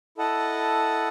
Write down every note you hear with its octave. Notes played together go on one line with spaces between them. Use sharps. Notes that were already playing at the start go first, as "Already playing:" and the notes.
E4 A4 D#5 F#5 A5